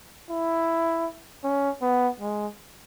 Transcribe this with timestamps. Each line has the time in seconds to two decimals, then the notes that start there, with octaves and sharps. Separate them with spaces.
0.30 E4
1.44 C#4
1.82 B3
2.21 G#3